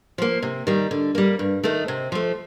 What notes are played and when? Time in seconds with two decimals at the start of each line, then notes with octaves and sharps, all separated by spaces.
0.18 F3 A#3
0.42 C3
0.67 D#3 G3
0.91 D3
1.15 G3 A#3
1.39 G2
1.64 D#3 A3 D#4
1.88 C3
2.12 F3 A3